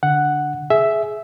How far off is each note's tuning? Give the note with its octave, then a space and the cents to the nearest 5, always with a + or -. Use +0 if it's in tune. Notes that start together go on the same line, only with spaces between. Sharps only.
D3 +0 F#5 +0
G#4 +20 E5 +0